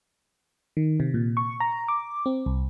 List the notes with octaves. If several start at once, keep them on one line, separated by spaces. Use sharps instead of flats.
D#3
C3
A#2
C#6
A#5
D6
C4
C2